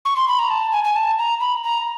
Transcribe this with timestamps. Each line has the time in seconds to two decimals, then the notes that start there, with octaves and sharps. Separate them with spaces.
0.05 C#6
0.16 C6
0.28 B5
0.39 A#5
0.50 A5
0.72 G#5
0.84 G#5
0.95 A5
1.19 A#5
1.40 B5
1.64 A#5